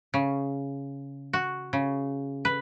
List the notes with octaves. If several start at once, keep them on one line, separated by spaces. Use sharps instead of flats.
C#3
F#4
C#3
B4